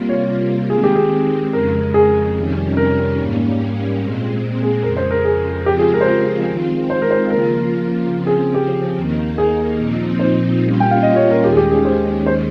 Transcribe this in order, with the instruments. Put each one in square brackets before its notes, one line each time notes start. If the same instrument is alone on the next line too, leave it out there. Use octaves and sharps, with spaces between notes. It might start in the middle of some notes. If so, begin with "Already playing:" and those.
Already playing: [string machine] C3 G3 A#3 F4
[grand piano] C#5
[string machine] D#3 G#3 C4 [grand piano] G#4
[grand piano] G4
G#4
[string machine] F2 C#3 G#3 [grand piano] A#4
[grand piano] G#4
[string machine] F2 C3 D#3 G3 C#4
[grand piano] A#4
[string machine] G#2 G3 A#3 C#4
A#2 G#3 C4
[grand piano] G#4
[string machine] F2 C#3 G#3 [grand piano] A#4
[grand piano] C5
A#4
G#4
[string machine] C#3 F3 G#3 C4 F4 [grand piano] G4
[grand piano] G#4
A#4
C5
A#4
[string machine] D#3 G#3 C4 F4
[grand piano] C5
A#4
C5
[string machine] C#3 F3 A#3 F4 [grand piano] A#4
[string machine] C#3 F3 C4
[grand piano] G#4
G4
[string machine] D#2 D#3 A#3 D#4
[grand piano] G#4
[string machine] A#2 F3 C4 D#4
[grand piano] C5
[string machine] A#2 G3 C#4 F4
[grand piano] G5
F5
D#5
C#5
A#4
[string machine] D#2 D#3 G#3 C#4 [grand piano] G4
[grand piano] G#4
G4
G#4
C5
C5